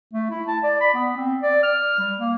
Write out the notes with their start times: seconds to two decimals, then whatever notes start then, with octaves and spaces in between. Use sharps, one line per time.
0.14 A3
0.30 E4
0.48 A5
0.63 D5
0.81 B5
0.95 B3
1.16 C4
1.43 D5
1.63 F6
1.99 G3
2.19 A#3